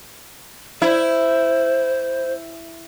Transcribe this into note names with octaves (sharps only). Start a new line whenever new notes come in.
E4 C5